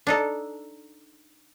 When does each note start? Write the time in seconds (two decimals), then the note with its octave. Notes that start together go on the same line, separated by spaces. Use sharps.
0.07 D4 D#4 A4